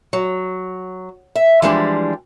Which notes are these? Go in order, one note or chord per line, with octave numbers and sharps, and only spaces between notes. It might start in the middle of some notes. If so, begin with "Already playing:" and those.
F#3
E5
E3 F3 G3 G#3 D4